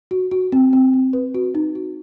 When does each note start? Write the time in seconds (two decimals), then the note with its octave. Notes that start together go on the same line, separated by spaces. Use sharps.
0.11 F#4
0.31 F#4
0.52 C4
0.73 C4
0.94 C4
1.13 B4
1.34 F#4
1.55 D#4
1.75 F#4